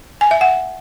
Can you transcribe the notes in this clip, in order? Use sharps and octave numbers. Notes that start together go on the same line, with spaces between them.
G#5
E5
F#5